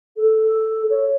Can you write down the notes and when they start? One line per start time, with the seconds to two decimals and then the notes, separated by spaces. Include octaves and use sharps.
0.17 A4
0.90 C#5